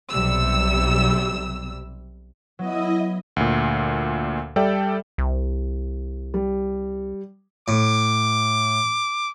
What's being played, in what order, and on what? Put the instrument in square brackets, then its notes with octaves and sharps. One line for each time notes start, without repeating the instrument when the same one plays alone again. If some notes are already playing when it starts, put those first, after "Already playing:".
[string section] B1 C3 G3 E6
[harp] F#3 B3 [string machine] E4 D#5
[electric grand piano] D2 A#2
G3 A4 D5 E5 G5
[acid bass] C2
[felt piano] G3
[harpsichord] A2 [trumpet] D6